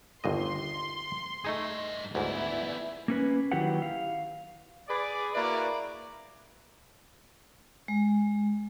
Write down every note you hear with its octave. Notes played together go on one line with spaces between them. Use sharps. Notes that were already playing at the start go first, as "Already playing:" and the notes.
G1 D#2 D#5 C6
G2 A3 D#4 G#4 D#5
D2 G#2 B3 E4 D5
A#3 C#4 B4
D#3 F#3 E4 G4 B4 F#5
F5
G#4 B4 D5
A#3 E4 F#4 B4 D5
G#3